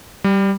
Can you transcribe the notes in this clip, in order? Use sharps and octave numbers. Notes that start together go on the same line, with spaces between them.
G3